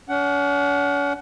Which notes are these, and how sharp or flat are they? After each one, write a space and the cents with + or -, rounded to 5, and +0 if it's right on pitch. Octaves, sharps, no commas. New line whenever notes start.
C#4 +45 F#5 +15